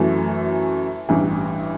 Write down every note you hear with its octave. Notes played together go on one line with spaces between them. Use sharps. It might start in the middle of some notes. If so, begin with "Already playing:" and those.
Already playing: F#2 E3 A3
A1 G2 E3